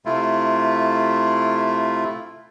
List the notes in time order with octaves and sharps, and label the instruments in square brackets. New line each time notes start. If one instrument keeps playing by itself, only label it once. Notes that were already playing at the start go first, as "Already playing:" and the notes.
[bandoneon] C3 A3 E4 F4